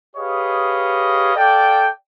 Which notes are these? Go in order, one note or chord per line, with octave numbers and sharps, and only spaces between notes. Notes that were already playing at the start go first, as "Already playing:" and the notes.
G4 G#4 B4 C#5 D#5 F5
A4 D5 F5 G5